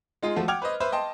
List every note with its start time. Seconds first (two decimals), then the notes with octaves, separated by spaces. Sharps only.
0.22 G#3 D#4 F4 G#4 F5
0.36 F3 A3 F#4
0.48 F#5 G5 D6 F6 G#6 F7
0.62 B4 C5 D#5
0.80 B4 C5 E5
0.92 D#5 G5 A5 C6